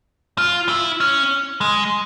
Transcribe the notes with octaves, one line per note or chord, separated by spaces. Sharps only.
F4
E4
C#4
G#3